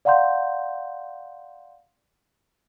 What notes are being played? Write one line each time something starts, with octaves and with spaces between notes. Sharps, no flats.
D5 F5 F#5 A#5 C6 G6